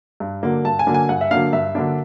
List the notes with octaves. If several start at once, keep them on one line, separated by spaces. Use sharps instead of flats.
G2
D3 F#3 A#3 D4
G2 A5
G#5
D3 F#3 A#3 D4
G#5
G2 F#5
E5
D3 F#3 A#3 D4 F5
G2 E5
D3 F#3 A#3 D4